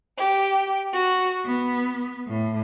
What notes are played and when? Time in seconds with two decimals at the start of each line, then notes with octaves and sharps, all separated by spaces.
0.18 G4
0.93 F#4
1.46 B3
2.27 A2